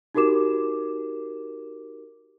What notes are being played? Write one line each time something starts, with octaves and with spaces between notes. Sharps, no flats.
D#4 F#4 G4 A#4 D6 E7